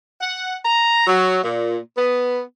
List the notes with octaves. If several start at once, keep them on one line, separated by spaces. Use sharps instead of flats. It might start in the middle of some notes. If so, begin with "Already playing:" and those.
F#5
A#5
F#3
A#2
B3